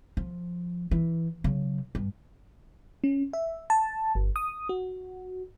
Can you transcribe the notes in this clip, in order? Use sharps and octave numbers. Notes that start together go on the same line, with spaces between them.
F3
E3
C#3 F#3
G2
C#4
E5
A5
G1
D#6
F#4